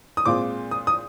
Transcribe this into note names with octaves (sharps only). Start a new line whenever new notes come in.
D#6
A#2 G#3 C4 F4 D6
D#6
D#6